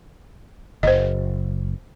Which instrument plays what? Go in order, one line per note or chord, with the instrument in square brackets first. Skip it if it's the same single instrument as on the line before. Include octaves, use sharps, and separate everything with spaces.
[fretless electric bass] F#1 [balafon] C5 D#5